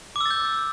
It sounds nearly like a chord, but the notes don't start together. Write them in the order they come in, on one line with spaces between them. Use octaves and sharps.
D6 E6 A6 G6